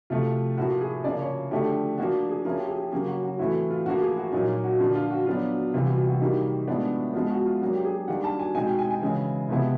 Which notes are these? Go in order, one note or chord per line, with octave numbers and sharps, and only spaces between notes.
C3 F3 A3 F4
A2 F3 A#3 F#4
G#4
C#3 F3 A#3 D5
C#5
D3 F3 A3 D4 G4
F3 A#3 D4 F#4
G#4
F3 A#3 C#4 E4 A#4
G4
G#4
G4
C#3 F#3 A#3 C#4 G4
F#4
F#4
A2 E3 A3 C4 E4 F#4
F4
A2 F3 A#3 F#4
G#4
F#4
A#2 F#3 A#3 D#4 F#4
F4
F#4
D3 F3 A#3 D4
F4
F#4
F#3 B3 D4 F4
C3 E3 G3 F4
F#4
F4
F#4
D#3 G3 A#3 D#4
A2 F3 G#3 B3 D4
F3 G#3 B3 F4
F#4
F4
F#3 A#3 D4 F#4
G4
G#4
D#3 G3 A#3 D4 F#5
A5
G#5
B2 G#3 C4 D#4 G#5
G5
G#5
G#5
C#3 E3 G#3
C3 F3 G#3 B3 E4